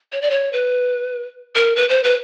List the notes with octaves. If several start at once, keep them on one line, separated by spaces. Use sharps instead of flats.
C#5
D5
C#5
B4
A#4
B4
C5
B4